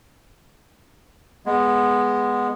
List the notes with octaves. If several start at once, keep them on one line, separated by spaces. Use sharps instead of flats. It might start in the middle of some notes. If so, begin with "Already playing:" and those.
G#3 B3